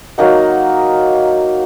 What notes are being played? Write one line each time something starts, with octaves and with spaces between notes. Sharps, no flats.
F#3 A#3 D#4 F#5